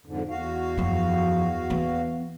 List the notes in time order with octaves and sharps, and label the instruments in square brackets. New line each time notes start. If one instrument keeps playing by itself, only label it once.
[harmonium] F2 G#2 D3
E2 F#4 F5
[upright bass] F#2 F3
E3 B3